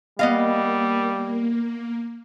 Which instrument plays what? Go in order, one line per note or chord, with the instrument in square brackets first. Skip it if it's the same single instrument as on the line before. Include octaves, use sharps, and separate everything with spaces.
[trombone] G3 [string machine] A#3 [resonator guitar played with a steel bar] B3 D#5 F5